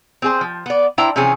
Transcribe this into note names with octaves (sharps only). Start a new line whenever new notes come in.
C4 G#4 C5
F3
B3 D5
D4 E4 C5 G5 A#5
C3 E3 F3 C#4 G#4